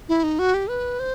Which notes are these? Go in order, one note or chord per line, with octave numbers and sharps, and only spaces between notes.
E4
D#4
F#4
G4
B4
C5